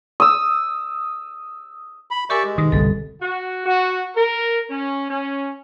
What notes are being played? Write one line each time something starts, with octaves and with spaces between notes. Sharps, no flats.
D#6 E6
B5
G4 A#4 D5 E5 G#5 C#6
G#3
B2 D#3
G1 C2 A4
F#4
F#4
A#4
C#4
C#4